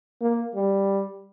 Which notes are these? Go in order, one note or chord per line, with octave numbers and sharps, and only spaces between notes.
A#3
G3